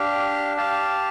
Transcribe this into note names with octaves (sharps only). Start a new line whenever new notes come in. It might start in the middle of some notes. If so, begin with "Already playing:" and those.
Already playing: D4 G4 F5
G4 F5 A5